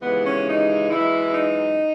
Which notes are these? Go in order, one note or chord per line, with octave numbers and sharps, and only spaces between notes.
D#2 C#3 E3 G#3 B3
C#4
D#4
F#2 E3 G#3 E4
D#4